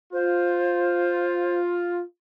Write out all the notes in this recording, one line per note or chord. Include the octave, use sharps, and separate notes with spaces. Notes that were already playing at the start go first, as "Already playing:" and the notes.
F4 C5